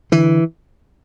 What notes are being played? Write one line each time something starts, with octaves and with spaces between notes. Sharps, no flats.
D3 E3